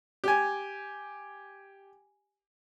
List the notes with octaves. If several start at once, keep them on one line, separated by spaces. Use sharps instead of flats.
G4 G#5